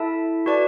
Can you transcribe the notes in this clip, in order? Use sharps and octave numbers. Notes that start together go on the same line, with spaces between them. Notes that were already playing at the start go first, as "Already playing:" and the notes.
Already playing: E4 A4 E5 A5
F#4 B4 D5 A5